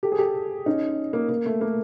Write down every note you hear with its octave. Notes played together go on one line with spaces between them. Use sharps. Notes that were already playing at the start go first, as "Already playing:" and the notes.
G4 A4
G#4
G4 A4
C#4 D#4
A#3
A#3
A3
A#3